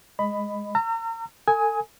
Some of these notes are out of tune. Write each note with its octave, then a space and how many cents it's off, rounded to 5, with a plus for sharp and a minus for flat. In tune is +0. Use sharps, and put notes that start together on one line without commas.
G#3 -5 D#5 +0 B5 +15
A#5 -35 E6 +45
A4 +35 G#5 +0 D#6 +30